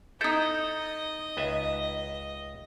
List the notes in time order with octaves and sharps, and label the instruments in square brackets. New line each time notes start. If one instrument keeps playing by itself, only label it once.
[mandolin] D#4 G6 [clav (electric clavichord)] E4 A4 [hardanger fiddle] D#5
[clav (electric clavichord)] C#2 B4 E5